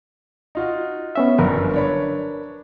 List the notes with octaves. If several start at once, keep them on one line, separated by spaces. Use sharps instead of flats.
D#4 F4 F#4
B3 C#4 E5
G1 F#2 A#4 B4
D4 C#5 B5